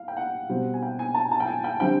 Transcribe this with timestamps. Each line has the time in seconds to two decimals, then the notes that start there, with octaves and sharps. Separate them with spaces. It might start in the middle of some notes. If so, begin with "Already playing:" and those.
Already playing: F5
0.08 G5
0.17 F#5
0.49 B2 G3 C4
0.74 G#5
0.82 G5
0.99 G#5
1.14 A5
1.32 A5
1.40 G5
1.47 G#5
1.64 G5
1.80 D3 G3 C4 G5